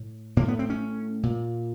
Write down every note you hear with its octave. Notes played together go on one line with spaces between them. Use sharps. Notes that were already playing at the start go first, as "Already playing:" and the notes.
Already playing: A2
A2 A#3
B3
C4
C#4
A#2